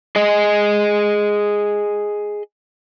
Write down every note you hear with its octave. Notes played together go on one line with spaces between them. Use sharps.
G#4 D#5